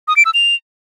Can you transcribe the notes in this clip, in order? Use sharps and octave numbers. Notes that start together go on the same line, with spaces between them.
D#6
D7
E6
F7